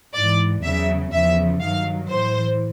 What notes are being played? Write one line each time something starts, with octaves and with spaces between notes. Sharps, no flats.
G#2 E3 D5
E2 C#3 F#3 E5
E2 C#3 F3 E5
G2 D#3 F#3 F5
A2 E3 C5